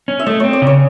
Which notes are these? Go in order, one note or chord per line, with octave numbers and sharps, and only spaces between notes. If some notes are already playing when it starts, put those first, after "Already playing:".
C#4
E5
A3 D#5
C4 C#5
D5
C#3 C#5